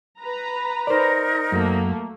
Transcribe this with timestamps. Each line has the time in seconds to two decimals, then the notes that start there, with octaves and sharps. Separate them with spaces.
0.19 B4 A#5
0.87 D#4 A#4 C5 D5
1.52 F#2 A3 A#3